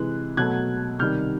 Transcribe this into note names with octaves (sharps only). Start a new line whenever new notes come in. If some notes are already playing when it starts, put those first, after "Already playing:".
Already playing: C3 E3 G#3 F#6
B2 F#3 A3 F#6 G#6
C3 D#3 G3 F6 G6